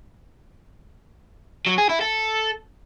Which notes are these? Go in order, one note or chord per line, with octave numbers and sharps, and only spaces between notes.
F#3
G#4
E4
A4